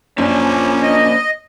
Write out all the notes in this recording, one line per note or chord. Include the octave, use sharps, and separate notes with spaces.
F#2 A#2 F3 C#4 D4
D#5